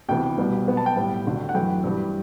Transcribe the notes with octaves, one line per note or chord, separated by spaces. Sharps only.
D2 C3 E3 B3 G5
C2 B2 G3 B3
B2 F#3 B3
A5
G5
A2 G3 B3
D2 D3 A3
F#5
F#2 E3 A3 G5
G2 E3 G3